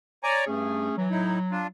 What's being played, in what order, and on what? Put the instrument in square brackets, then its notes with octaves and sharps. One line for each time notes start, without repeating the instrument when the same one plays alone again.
[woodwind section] C#5 [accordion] D5 G#5 A#5
[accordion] G2 [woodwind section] A3 C#4 G#4
[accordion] E3 [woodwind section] F#3
[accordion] A2 D#4 E4
D4 F4